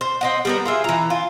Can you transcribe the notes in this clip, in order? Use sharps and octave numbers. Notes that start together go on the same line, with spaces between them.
C5
C4 D#5 F#5
G3 B3 A#4
F4 G#4 E5
E3 A#5
F4